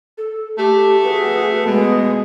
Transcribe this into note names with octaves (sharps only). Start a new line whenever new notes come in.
A4
A3 G4
F#4 G#4 B4
B2 G#3 G#4